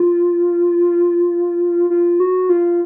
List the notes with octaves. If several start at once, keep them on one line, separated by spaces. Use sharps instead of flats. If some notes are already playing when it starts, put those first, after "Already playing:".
Already playing: F4
F4
F#4
F4